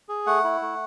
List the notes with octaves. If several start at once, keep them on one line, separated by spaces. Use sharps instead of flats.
G#4
A3 F#5
E4
A3